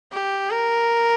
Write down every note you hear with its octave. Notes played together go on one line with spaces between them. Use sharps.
G4
A#4